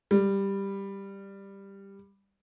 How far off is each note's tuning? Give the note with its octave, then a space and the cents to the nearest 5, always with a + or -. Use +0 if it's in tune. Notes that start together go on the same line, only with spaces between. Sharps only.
G3 +5